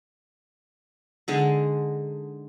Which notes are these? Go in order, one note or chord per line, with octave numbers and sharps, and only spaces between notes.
D3 G#3 D#4